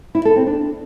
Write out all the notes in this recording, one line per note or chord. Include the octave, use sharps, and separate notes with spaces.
E4
A4
C4
D4